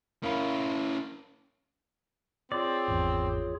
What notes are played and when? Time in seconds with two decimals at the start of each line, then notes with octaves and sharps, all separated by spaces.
0.23 C#4 E4 A#4 F5 B5
2.52 C4 F4 G#4 C#5 D5
2.88 G#1 E2